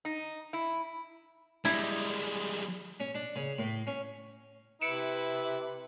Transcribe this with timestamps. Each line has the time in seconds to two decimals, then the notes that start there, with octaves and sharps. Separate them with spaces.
0.05 D#4
0.53 E4
1.65 G3 G#3 E4
3.00 C#4
3.15 D4
3.36 C#3
3.58 A2
3.87 C#4
4.81 C3 E4 B4 C#7 D7 E7